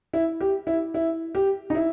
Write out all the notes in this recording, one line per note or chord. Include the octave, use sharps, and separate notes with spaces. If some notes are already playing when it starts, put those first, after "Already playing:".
E4
G4
E4
E4
G4
D#4
E4